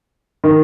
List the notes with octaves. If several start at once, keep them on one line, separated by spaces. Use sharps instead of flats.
D#3